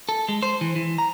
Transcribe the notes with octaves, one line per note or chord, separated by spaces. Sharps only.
A4
G#3
C5
E3
E3
A#5